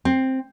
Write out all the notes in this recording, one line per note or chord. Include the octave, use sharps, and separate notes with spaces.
C4